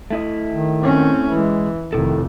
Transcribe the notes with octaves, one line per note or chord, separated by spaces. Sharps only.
A3 E4 D#5
D#3
C4 C#4
E3 G#3
F1 D#3 E4 A4